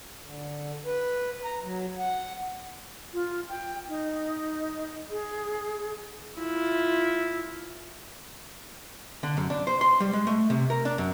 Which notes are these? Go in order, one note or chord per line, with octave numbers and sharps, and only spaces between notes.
D3
B4
A#5
F#3
F#5
F4
G5
D#4
G#4
E4 F4
D3
F#2
D4
C5
C6
G3
G#3
A3
C3
A#4
D4
F#2